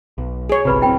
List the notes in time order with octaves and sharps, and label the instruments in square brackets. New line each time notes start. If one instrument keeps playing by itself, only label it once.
[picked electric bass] B1
[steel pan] G#4 C#5
[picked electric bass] G1 C2 C3 [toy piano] F#4 B4 B5
[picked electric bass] D1 C4 [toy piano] E4 G5 B5